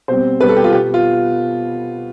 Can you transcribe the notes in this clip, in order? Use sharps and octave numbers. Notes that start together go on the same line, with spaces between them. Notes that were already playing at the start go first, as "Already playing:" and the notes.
B2 G3 C4 C5
B2 G3 C4 B4
A4
G4
F4
B2 B3 G4
F4